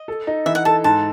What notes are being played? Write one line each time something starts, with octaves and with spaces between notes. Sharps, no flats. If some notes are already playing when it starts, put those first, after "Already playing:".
Already playing: D#5
A4
D#4
E3 E5
F#5
A4 A5
G#2 A5